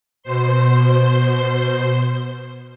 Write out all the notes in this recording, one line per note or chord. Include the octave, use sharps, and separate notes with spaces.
B2 C5 C6